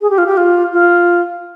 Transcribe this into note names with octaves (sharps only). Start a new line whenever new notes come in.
G#4
G4
F4
G4
F4
F4